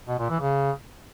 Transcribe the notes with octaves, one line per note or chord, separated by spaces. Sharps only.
B2
A#2
E3
C#3